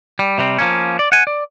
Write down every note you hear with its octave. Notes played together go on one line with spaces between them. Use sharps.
G3
C3 G3 C4
F3 A#3 C#4
D5
F#5 G#5
D5